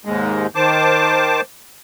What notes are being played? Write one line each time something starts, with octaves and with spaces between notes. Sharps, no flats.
D#2 G#2 G#3
D#3 C5 A5 D6